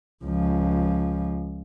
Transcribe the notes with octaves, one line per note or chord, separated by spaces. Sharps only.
C#2 F3